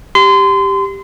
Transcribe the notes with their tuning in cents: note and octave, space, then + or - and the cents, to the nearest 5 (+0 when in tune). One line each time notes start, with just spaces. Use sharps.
G4 +0 C6 -30